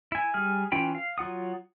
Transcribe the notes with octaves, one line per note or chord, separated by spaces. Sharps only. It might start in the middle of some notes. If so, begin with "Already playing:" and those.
E4 G#5
G3 G#4 F6
E3 C#4 F4 G5 B5
F5
F#3 F4 F#5 D#6